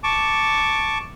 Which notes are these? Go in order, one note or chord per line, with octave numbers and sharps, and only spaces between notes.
A5 C#6 D6